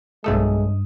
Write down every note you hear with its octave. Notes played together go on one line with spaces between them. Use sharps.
B1 G2 G#3 A3 A4 D#6